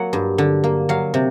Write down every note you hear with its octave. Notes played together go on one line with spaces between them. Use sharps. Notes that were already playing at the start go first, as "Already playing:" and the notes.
Already playing: F#3 A#3 F#5
G2
D3
A#3
F#3 F5
C3